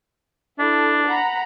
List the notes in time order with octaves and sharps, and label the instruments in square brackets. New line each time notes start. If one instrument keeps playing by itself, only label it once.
[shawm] D4 [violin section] E4 A4
[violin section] F#5 A#5 B5